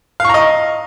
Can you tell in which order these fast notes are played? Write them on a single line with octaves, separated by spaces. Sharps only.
F5 C#6 A#5 D#5